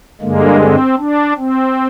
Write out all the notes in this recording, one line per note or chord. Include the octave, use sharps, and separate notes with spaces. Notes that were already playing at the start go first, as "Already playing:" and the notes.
G2 D3 G#3 A#3
C4
D4
C4